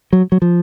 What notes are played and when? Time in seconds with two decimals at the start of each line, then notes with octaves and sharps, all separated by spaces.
0.13 F#3
0.32 F#3
0.42 F3